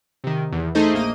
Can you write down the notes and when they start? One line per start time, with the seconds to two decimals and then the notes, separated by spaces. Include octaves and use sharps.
0.24 C3 D#3
0.52 E2
0.75 A3 D#4 G#4 C5 D#5
0.94 A#1 A#3 D#5 D#7